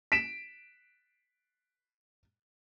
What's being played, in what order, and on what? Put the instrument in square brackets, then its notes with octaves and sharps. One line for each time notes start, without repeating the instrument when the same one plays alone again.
[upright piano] B6 D7 E7